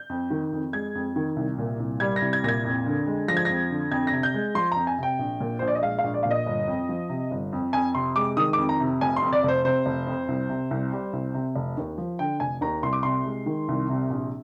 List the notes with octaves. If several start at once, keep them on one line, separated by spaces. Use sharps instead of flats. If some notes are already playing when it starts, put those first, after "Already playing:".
Already playing: G6
F2
D#3
F2
G#3 G#6
F2
D#3
C2
A#2
C2
G3 G#6
A#6
C2
G#6
A#2 G#6 A#6
F2
D3
G#3
F3 A#6
G#6
F2 A#6
D3
F2 G#6
A#6
C3
G6
G#3
F3 C6
F2 A#5
G#5
C3 G5
A#1
A#2
C5
A#1
D5
D#5
G#3 F5
F5
A#1
D5
A#2 F5
D#5
G1
F2
F3
C3
G1
F2
F2 G#5
C3 C6
G#3 D6
D#3 D#6
F2 D6
A#5
C3
F1 G#5
C6
F2
D5
F1
C5
C3 C5
F1
F2
C2
C3
C2
G3
C2
C3
F1
D#2
F3
D3 G5
F1 G#5
D#2 A#5
C2 C6
D6
C3 C6
G#3
D#3
C2
C3
A#1